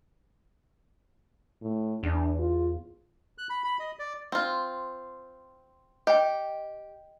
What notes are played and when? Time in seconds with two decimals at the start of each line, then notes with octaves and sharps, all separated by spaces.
1.61 A2
2.03 E2 D4
2.39 F4
3.38 F#6
3.50 B5
3.64 B5
3.79 D#5
3.99 D5
4.32 C4 F4
6.07 G4 D#5 G5